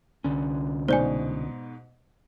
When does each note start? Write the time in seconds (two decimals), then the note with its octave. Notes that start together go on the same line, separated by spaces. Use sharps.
0.24 C2 D3 C#4
0.88 G#2 B2 C5 D5 G#5